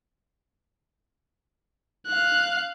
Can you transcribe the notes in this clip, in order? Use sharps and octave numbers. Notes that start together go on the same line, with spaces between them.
F5 F#6